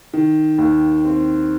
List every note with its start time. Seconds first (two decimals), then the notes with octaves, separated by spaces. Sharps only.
0.14 D#3
0.58 D#2
1.04 C4